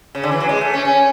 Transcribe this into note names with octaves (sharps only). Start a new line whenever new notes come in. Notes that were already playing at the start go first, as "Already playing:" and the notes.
C#3
D3
E3
F#3
G#3
A3
C#4
C#4